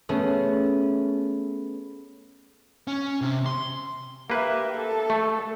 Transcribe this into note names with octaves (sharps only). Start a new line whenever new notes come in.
A3 B3 C#4 G#4
C#4
C3
C6
A#3 G4 B4 E5
A4
A3